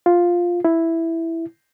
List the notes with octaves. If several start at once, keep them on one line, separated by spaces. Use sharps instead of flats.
F4
E4